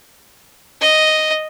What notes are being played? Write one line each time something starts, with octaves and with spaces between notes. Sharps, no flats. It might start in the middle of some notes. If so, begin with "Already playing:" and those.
D#5